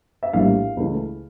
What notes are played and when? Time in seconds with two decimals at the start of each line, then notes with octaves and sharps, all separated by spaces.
0.23 E5
0.33 A#1 A2 G3 A#3 F5
0.77 C#2 C#3 E3 A3